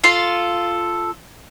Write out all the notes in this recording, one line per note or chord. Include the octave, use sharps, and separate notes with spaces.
F4 A4 C6